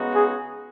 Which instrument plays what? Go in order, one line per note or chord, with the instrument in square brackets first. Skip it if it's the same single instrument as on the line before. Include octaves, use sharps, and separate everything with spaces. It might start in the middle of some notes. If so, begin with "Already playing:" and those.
Already playing: [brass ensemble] C#3 G#3 B3 D#4 F#4
[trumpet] G#4